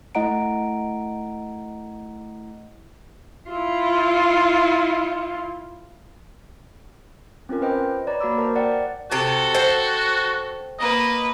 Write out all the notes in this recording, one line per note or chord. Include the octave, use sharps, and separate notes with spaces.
A3 E4 D#5 F#5 A#5 D7
E4 F4
C4 C#4 F4 A#4
B4 C5 D#5 G5
B4 C#5 D5 A#5
A#3 F#4 A#5 B5 D6 E6
A#4 C5 A5 A#5
D5 F#5 G5
C3 F#4 G4 A4
C5 F#5 G5
A#3 B4 D#5